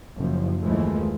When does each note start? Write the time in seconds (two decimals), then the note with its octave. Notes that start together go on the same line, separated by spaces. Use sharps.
0.19 F#1 F3
0.62 D#2 E3 F3 G#3 A3